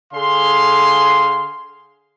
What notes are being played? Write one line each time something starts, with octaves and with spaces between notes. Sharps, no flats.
D3 G#4 F5 C6